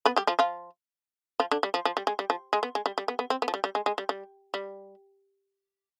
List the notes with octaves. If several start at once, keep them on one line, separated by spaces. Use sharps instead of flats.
B3 B4
G3 G4
F3 F4
F3 F4
F3 F4
D3 D4
G3
F3
F3
G3
G#3
G3
F3
G#3
B3
G#3
G3
G3
B3
B3
C4
B3
F3
G3
G3
G#3
G#3
G3
G3
G3